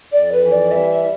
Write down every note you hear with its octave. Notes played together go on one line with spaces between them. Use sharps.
F2 D5
B4
E3
D5
G3 E5
E5